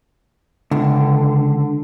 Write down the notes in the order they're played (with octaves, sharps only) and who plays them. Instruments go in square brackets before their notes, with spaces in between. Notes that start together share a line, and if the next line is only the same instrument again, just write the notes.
[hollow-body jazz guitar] C#2 [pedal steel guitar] D3